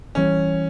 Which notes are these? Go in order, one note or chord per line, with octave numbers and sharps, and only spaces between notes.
E3 G3 C#4